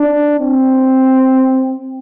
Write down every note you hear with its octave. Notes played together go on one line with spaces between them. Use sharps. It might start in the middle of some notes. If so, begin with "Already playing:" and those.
Already playing: D4
C4